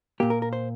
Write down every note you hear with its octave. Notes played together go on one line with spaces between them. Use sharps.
A#2 A#3 G4
A#4
A#4
C5